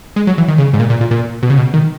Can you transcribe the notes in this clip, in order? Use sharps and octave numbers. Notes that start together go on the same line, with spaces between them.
G#3
F#3
E3
D#3
C#3
G#2
A#2
A#2
A#2
A#2
B2
C#3
B2
D#3